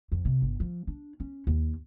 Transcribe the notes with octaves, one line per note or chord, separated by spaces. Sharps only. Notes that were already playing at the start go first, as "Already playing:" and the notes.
F2
C3
G1
F3
D4
C#4
D#2